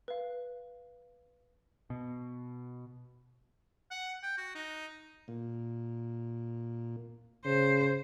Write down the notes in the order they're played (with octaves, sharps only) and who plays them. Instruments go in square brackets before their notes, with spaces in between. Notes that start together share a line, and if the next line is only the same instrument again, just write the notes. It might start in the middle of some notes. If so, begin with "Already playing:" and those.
[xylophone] B4 F5
[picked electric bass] B2
[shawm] F#5
G5
F#4
D#4
[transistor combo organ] A#2
[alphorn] C#3 [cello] C5